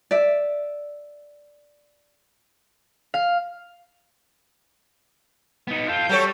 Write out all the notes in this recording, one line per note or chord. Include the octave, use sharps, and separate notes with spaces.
D5 E5
F5
B3 D#4
F4 A4 G6
F#3 G3 A4 C#5